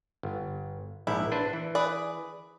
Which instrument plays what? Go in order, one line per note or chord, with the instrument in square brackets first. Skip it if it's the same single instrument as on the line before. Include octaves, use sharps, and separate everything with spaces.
[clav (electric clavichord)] G1
[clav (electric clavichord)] A#1 G#2 [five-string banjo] E4
[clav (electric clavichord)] D4 B4 C5
E3
[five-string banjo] G#4 B4 D5